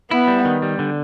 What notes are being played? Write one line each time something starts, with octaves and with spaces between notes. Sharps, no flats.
B3 E4
G3
D#3
G3
D3